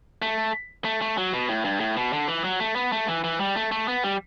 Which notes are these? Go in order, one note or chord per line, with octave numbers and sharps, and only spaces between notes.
A3
A3
A3
F#3
B2
A2
G2
A2
B2
D3
E3
F#3
A3
B3
A3
E3
E3
G3
A3
A3
B3
G3